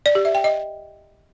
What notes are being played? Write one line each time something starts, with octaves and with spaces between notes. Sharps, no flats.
D5
G4
E5
G5
D#5